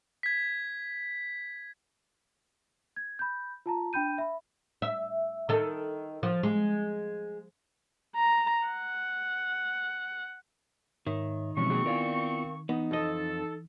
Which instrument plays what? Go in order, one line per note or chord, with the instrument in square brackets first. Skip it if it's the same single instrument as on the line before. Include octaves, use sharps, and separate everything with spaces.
[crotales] G#6 B6
[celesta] G#6
B5 G6
F4 A5 A#5
D4 G5 B5 G6 D#7
E5 B5
[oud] E5
D#3 A4
F3
G#3
[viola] A#5
F#5
[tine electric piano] G#2 C#5 E5 [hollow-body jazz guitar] D#3
[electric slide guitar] E2 G2 C#4 [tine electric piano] B2 F3 G#3 [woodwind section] C4 C#6
[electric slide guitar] A#3 F#4 G#4
[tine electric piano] B3 E4 F4 [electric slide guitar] A#4 D5 F5
[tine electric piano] E3 [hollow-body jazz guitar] B3 [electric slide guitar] D#4
[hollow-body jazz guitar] F2 D#5 [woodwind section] A4